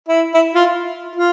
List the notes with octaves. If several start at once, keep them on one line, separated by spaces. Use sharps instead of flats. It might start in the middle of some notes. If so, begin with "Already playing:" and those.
E4
E4
F4
F4